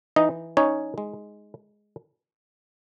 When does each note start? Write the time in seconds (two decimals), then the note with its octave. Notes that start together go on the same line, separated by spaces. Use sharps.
0.16 E3 D#4 D#5
0.57 C#4 D#4 C#5
0.98 G#3